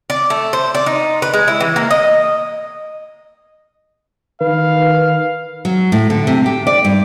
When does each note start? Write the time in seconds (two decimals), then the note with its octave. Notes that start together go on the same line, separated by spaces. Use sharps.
0.10 D5
0.30 A3
0.53 C5
0.75 D5
0.86 D#4
1.22 B4
1.34 G#3
1.48 E4
1.61 E3
1.76 A#3
1.91 D#5
4.41 D#3 B4 F5
5.65 F#3
5.92 A2
6.10 D3
6.27 C3
6.46 G4
6.67 D5
6.85 G2